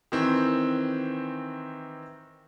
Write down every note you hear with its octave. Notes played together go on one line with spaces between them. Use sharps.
D#3 E3 C4